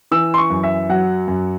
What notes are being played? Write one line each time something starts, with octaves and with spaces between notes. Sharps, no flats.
E3 E6
C6
C#6
F#2
E5
F#3 F#5
F#2